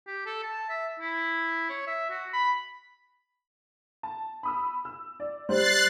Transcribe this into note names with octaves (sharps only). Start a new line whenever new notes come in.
G4
A4
A5
E5
E4
C#5
E5
F#4
B5
A5
B5 D#6 E6
E6
D5
G3 C5 F#6 A6 C7